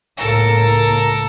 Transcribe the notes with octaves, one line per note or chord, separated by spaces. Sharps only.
C#2 A2 A#3 A4 A#4